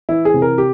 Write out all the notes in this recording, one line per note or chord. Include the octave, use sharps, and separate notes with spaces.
E3 E4
G#4
C3
A#4
G4